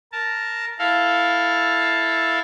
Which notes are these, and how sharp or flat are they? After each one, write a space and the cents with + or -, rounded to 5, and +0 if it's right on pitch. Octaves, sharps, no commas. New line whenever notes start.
A#4 +0 A5 +0
E4 +0 A4 +0 F5 +5